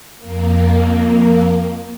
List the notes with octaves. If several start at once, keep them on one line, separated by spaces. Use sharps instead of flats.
F2 A#3